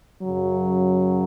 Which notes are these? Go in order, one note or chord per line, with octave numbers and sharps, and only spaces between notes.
F#2 C#3 F#3